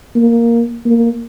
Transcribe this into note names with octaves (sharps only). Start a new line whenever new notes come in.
A#3
A#3